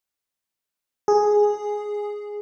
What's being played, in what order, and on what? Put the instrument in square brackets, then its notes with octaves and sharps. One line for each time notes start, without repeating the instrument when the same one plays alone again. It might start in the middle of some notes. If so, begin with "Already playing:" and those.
[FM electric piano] G#4